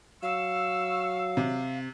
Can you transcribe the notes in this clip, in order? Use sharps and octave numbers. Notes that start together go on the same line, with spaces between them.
F#3 F5 C#6 E6
C3